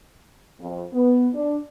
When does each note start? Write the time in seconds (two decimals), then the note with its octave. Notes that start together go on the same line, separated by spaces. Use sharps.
0.60 F2
0.93 B3
1.35 D4